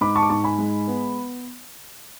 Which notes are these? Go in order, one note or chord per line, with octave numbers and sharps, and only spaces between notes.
G#2 B5 D6
A5 C#6
D6
G#2 A5 C#6
G#5 B5
G#3
B3